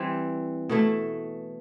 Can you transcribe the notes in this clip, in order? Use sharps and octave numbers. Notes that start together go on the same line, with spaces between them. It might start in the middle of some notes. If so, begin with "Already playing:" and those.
Already playing: E3 G3 C4
B2 A3 E4